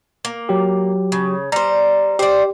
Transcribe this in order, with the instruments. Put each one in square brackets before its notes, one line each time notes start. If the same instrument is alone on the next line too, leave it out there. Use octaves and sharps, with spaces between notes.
[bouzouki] A#3
[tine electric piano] F#3 G4
[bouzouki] C#3
[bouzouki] G3 C5 [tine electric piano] A#5
[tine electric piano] G4 [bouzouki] C5 D5